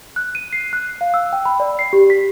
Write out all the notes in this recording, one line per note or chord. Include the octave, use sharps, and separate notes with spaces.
F#6
D#7
C7
F#6
F5
E6
G5
B5
D5
C7
G4
B6